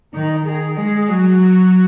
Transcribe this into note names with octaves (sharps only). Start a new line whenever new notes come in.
D#3 D#4
D#3 G#4
G#3 G#4
G#4
F#3 F#4